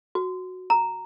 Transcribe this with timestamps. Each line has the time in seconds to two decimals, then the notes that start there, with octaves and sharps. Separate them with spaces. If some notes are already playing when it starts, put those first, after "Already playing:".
0.15 F#4
0.70 A#5